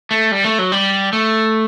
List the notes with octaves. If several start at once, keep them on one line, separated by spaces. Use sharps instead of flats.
A3
G3
A3
F#3
G3
A3